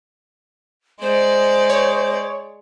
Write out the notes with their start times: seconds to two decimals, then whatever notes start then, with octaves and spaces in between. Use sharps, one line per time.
1.02 G#3 C5 D5
1.70 C#5